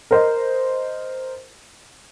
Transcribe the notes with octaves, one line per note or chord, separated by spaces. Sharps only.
A#4 C5 D#5